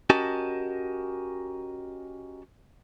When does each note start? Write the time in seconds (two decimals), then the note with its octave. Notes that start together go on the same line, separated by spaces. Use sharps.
0.10 C#4 F#4 G4 A#4 D#5 A5